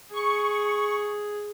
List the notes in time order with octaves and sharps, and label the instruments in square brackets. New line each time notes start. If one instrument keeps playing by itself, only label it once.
[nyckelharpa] G#4 [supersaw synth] C#6